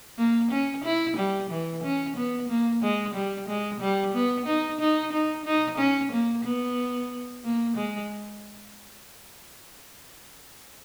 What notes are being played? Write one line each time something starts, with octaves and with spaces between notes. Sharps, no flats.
A#3
C#4
E4
G3
E3
C#4
B3
A#3
G#3
G3
G#3
G3
B3
D#4
D#4
D#4
D#4
C#4
A#3
B3
A#3
G#3